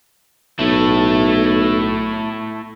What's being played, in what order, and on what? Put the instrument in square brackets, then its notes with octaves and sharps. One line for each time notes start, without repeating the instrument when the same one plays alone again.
[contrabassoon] B1 [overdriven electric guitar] A3 E4